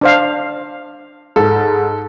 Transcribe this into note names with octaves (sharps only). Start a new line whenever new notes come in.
D4 C5 F5
G#2 A4